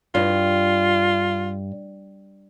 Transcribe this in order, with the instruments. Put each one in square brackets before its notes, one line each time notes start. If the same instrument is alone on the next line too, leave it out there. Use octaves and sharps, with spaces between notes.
[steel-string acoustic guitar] G2 [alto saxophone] F4